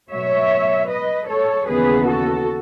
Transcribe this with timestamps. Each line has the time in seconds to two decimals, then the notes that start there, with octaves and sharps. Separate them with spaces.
0.11 B2 F#3 A3 C#5 E5
0.89 B4 D#5
1.29 A4 C#5
1.67 D#2 C#3 E3 B3 G#4 B4
2.06 F#4 A4